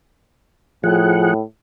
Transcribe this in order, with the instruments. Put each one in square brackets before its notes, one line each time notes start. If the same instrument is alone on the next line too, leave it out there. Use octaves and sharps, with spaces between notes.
[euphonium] A2 [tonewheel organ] F3 G#4 F#5